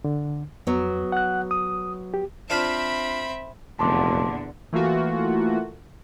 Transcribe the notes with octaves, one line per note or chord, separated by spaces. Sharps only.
D3
F2 F#3 B3
F#5 F#6
D#6
G4
C4 D4 F4 C5 E5 B5
F1 E2 A#2 D3 A5 C6 D6
E3 A3 A#3 F4 F#4